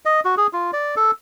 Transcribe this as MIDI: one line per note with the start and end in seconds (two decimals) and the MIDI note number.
0.05 0.20 75
0.25 0.35 66
0.37 0.47 68
0.53 0.71 65
0.73 0.95 74
0.96 1.11 69